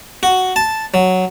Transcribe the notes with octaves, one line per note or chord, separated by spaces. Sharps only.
F#4
A5
F#3